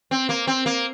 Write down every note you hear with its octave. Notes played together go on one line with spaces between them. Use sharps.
C4
A#3
C4
A#3